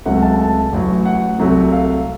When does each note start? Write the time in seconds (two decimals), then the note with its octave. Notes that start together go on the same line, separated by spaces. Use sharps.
0.06 C#2 C3 F#3 A3 F#5
0.17 F#5
0.22 A5
0.39 A5
0.72 A1 A2 F#3
1.06 F#5
1.39 C2 C3 F#3 A3
1.72 F5